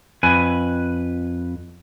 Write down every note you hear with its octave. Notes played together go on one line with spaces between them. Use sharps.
F2 B4 G#5